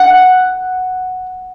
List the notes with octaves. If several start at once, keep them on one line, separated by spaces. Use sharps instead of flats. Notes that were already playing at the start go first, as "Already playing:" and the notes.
Already playing: F#5